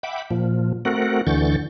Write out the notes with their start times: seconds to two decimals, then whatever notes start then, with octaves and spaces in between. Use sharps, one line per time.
0.03 E5 F#5 G5 B5 D6
0.31 A#2 F3
0.85 A3 C4 F#4 A#4 F#5
1.27 D2 D3 E3 C#6 G6 A6